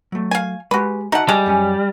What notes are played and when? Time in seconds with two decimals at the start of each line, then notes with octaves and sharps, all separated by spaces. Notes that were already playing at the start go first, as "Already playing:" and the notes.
0.12 F#3 A3
0.31 F5 G#5
0.71 G#3 F#4 G4 B4
1.12 D#4 F#4 E5 F#5 A5
1.29 G3 G#3
1.46 F#2 C#4 G#5